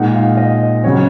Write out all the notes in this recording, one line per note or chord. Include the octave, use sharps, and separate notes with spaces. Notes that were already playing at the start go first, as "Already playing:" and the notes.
Already playing: A#2 G#3 D#4 F#5
F5
D#5
C#3 F#3 C#4 C#5